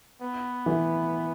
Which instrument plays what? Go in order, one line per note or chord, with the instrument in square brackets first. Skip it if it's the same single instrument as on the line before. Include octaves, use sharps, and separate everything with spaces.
[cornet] B3
[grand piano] E3